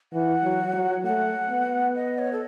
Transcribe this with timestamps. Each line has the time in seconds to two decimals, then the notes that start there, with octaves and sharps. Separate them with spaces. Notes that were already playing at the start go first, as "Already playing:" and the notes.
0.13 E3 F#5
0.44 F#3
0.74 F#3
1.05 A3 F#5
1.50 B3
1.95 D#5
2.19 C#5
2.33 A4